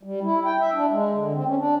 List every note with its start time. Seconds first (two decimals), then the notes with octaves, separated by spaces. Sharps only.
0.03 G3
0.23 E4
0.45 G5
0.60 E5
0.74 D4
0.91 G#3
1.14 D3
1.33 C4
1.46 C#4
1.58 D4